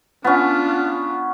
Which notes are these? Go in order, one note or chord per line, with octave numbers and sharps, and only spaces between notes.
B3 C#4 D4 F4